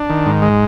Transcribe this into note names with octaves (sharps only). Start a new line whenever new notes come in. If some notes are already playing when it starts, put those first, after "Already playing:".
Already playing: D4
D#3
G#2
G#3